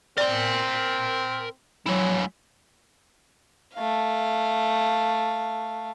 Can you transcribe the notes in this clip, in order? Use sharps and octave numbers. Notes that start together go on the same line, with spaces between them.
C4 A#4 D5 C6
F#3 G#3 E4
A3 F5